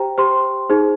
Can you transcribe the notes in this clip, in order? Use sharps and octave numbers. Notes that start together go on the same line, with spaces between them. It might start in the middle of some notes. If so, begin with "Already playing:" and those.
Already playing: G4 C5 G5 A#5
G4 C5 C6
D#4 G#4 C5